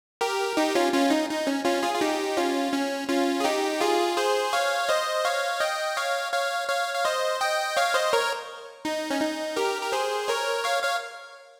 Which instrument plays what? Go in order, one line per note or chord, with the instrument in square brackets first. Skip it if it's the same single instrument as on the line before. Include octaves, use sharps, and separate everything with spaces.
[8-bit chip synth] G4 A#4
D#4 G4
C#4 F4
C#4 F4
D#4
D#4
C#4
C#4 F4
F4 G#4
F4
D#4 G4
C#4 F4
C#4
C#4 F4
G#4
D#4 G4
F4 G#4
G#4 C5
C#5 F5
C5 D#5
C#5 F5
D#5 G5
C#5 F5
C#5 F5
C#5 F5
F5
C5 D#5
D#5 G5
C#5 F5
C5 D#5
A#4 C#5
D#4
C#4
D#4
G4 A#4
A#4
G#4 C5
A#4 C#5
C#5 F5
C#5 F5